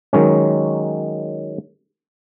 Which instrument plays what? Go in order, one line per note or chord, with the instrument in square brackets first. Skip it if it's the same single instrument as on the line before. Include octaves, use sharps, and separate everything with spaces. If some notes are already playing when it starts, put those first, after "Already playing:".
[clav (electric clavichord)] D#3 F#3 G#3 C#4